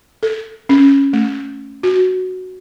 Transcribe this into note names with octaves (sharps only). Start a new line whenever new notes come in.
A4
C#4
A3
F#4